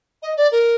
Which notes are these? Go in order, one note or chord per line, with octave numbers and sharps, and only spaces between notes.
D#5
D5
A#4